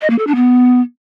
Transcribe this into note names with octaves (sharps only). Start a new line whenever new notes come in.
D#5
A#3
A4
D4
B3